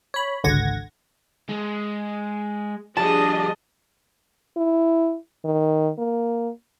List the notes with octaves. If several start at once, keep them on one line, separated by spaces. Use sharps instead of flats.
C#5 B5
G#1 C#2 D3 F#5 G#6 A#6
G#3
F3 G3 D4 G#4 D#5 A5
E4
D#3
A#3